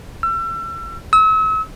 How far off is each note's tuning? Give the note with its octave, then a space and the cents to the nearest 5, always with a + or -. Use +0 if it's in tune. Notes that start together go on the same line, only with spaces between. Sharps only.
E6 +35
E6 -40